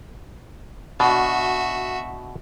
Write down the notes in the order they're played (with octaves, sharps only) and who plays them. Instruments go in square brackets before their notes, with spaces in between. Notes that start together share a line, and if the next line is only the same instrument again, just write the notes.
[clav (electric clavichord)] B2 D4 [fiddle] F#4 E5